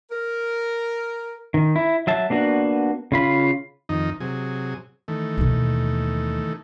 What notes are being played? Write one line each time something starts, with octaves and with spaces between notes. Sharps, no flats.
A#4
D#3
E4
F#3 E5 A5
A#3 B3 D4 F#4
C#3 F4 B5
F2 D#3 D#4
C3 F#3 G#4
D#3 E3 A3
D#2 B2